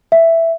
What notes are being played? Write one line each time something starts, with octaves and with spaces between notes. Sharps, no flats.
E5